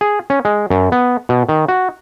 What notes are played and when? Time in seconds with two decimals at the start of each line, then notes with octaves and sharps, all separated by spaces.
0.01 G#4
0.30 C#4
0.45 G#3
0.70 F#2
0.92 B3
1.29 B2
1.49 D#3
1.68 F#4